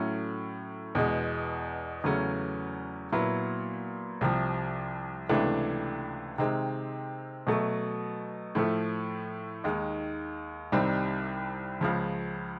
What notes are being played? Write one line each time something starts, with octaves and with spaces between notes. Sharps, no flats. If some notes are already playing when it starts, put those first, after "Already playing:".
Already playing: A2 F#3 A3 C#4
E2 B2 G#3
E2 C#3 F#3 A3 C#4
A#2 F#3 B3 E4
C2 C3 F3
C#2 C3 E3 A3 D4
C3 D#3 G#3 C4
B2 F#3 A3
A2 F3 A3
D#2 D#3 G#3
C2 C3 D#3 G3 C4
C#2 C#3 F3